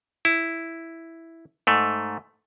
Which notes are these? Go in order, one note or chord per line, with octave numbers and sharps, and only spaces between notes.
E4
G#2 A3